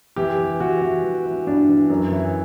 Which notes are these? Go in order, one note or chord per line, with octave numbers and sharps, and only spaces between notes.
E3 G4
E3
E3 F#4
E3
E3
E3
G2 D4
E3
F#2
E3